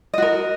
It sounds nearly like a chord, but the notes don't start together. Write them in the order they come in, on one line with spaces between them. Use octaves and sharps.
D#5 F#4 A#4